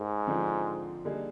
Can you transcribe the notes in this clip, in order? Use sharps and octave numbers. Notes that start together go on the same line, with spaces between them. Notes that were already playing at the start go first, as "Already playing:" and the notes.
Already playing: G#2 G#3 D#4 A#4
D3 F3 C4
D3 G3 A#3 D#4 G#4